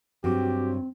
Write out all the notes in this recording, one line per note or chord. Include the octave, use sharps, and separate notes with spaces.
G2 F#3 C4 F#4 G4 D6